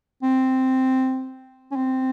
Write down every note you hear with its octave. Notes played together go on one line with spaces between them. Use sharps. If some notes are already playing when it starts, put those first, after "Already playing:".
C4
C#4
C4